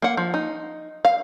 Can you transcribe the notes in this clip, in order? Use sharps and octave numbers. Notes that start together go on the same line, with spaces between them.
A#3 F#5
F3
D#4
F5